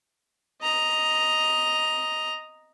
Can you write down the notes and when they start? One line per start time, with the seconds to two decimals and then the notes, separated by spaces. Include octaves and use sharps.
0.62 D#5 A#5